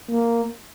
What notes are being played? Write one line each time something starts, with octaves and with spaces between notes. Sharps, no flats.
A#3